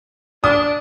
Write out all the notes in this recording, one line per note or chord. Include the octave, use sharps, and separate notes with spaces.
D4 D#6